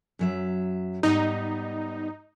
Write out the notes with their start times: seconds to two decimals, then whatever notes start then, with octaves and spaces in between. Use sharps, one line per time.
0.19 F#2 F#3 E5
1.03 G#2 G3 B3 D#4